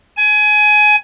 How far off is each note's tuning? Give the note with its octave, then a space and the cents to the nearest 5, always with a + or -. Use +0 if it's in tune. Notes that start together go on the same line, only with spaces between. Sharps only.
G#5 +20